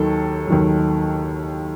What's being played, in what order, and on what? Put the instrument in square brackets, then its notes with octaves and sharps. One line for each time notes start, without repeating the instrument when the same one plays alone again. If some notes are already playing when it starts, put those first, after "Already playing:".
Already playing: [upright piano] D#2 D#3 F#3 [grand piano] A4
[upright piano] D#2 D#3 F#3